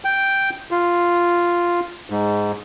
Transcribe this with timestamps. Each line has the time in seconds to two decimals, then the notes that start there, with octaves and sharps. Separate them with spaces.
0.04 G5
0.71 F4
2.10 G#2